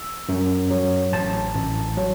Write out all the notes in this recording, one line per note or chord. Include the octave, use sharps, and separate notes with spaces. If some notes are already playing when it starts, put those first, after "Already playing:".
Already playing: E6
F#2
F#3
A1 A5
A1
F#3